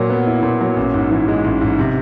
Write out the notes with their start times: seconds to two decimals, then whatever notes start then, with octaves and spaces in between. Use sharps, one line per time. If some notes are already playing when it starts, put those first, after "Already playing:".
Already playing: A#2 F#3
0.10 B3
0.27 E4
0.43 A#2
0.61 F#3
0.77 A1
0.94 G#2
1.11 E3
1.28 G#3
1.44 A1
1.61 G#2
1.79 C3